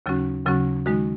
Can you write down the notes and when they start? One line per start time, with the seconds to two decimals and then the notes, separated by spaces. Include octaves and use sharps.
0.06 D#2 C#3 F#3 C#4 F#4
0.45 D#2 C#3 F#3 C#4 F#4
0.86 D#3 G#3 D#4 F#4